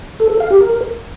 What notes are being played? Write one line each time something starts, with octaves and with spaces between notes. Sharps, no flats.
A4
A4
F5
G4
A#4